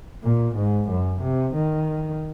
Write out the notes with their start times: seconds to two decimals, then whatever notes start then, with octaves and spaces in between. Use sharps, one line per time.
0.24 A#2
0.56 G#2
0.89 F#2
1.21 C3
1.54 D#3